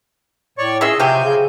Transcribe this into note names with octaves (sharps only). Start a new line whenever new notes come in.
A2 C#5 D5 C#6
C#4 F4 G#4 D#5 E5 E6
C3 F3 F#3 C4 G4 G#5 G6
C#3